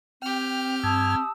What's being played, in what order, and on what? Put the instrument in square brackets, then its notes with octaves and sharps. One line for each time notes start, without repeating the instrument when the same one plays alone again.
[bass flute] C4 [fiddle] G4 F6 [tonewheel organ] G5
[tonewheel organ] G2 G#6 [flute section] A5 D#6 E6